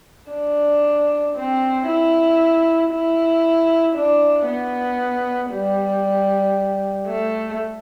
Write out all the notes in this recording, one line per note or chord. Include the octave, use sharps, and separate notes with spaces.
D4
C4
E4
E4
D4
B3
G3
A3